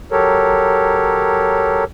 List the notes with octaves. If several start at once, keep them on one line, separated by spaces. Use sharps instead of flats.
F#3 G4 A4 A#4 C#5